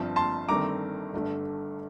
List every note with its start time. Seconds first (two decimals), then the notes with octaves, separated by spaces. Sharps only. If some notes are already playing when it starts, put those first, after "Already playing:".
Already playing: G1 G2 F3 C4 A5
0.16 A5 C6
0.48 G1 G2 D#3 A3 C4 A#5 D6
1.14 G1 G2 D3 A3